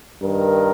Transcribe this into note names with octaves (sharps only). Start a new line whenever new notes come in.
G2 D#3 A#4